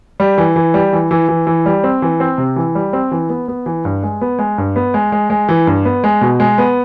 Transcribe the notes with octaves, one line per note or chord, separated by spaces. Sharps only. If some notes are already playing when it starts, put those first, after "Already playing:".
G3
E3
E3
G3
E3
E3
E3
E3
G3
C4
E3
C4
C3
E3
G3
C4
E3
B3
B3
E3
G2
G#3
B3
G#3
G2
B3
G#3
G#3
G#3
E3
G2
B3
G#3
B2
G#3
B3